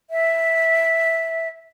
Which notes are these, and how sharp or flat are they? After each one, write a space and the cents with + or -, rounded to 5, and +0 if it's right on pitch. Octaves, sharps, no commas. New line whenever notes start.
E5 -5